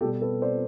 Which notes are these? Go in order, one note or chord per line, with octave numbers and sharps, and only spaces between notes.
B2 G3 G4 A4
A4 B4
C5 D5